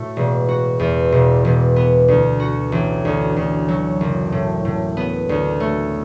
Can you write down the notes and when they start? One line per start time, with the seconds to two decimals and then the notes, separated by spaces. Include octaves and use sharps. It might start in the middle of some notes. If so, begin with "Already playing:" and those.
Already playing: A2 A3 F#4
0.16 E1
0.49 F#4
0.79 E2
1.12 E1
1.45 E1
1.76 B3
2.08 D2
2.40 F#4
2.72 A1
3.05 D2
3.36 D2
3.68 F#3
4.01 F#1
4.32 A2
4.65 A2
4.97 B3
5.29 D2
5.60 A3